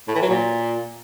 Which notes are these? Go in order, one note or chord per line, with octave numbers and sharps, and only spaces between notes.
A2
E3
F#3
A#2